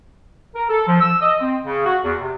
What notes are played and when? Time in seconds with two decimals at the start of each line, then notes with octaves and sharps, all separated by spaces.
0.55 A#4
0.70 A4
0.87 F3
1.01 E6
1.21 D#5
1.41 C4
1.65 C#3
1.86 F#4
2.03 E2
2.20 C3